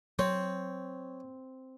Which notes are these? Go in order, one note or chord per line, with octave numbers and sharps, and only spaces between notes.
F#3 C4 C#5